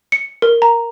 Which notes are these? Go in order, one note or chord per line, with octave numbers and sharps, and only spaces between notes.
C#7
A#4
A#5